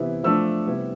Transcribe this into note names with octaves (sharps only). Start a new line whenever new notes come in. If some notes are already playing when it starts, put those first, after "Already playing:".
Already playing: C3 E3 B3 E4
F3 A3 D4 E6
C3 G3 B3 E4